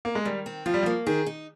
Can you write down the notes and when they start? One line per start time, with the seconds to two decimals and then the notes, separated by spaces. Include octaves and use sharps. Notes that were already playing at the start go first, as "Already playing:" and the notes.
0.05 A#3
0.15 G#3
0.25 D#3 G3
0.46 C4
0.66 F3 F4
0.74 G3
0.83 F3
0.86 A#3
1.07 D#3 G#4
1.26 D#4